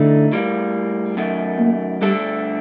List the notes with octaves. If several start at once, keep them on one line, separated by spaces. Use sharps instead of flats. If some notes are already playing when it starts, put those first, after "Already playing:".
Already playing: A2 D3 A3 D#4 A4
A2 G3 A#3
F#2 D#3 A3
A#3
G2 D3 G3 A3 D4 A4